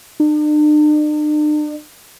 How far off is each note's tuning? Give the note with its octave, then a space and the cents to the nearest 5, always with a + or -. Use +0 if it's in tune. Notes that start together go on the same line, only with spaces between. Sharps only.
D4 +45